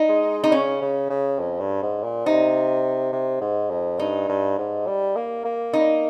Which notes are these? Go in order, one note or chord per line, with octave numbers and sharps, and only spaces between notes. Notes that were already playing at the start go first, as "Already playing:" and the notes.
Already playing: D#4
G#3
D#4
C#3 C#4
C#3
C#3
F2
G2
G#2
A#2
C3 D#4
C3
G#2
F2
G2 D#4
G2
G#2
G3
A#3
A#3
D#4